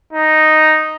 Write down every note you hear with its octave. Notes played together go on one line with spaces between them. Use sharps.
D#4